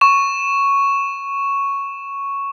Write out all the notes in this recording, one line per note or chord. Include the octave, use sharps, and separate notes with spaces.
C#6 E7